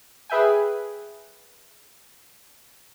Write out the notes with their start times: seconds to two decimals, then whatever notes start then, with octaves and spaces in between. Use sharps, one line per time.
0.30 G#4 B4 E5 G5 G#5